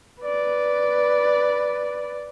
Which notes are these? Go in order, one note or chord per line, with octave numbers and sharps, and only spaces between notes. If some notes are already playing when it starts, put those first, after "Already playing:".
B4 D5